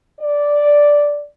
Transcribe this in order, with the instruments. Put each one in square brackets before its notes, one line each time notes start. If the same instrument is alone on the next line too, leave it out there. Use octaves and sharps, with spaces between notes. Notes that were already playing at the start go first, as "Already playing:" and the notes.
[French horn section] D5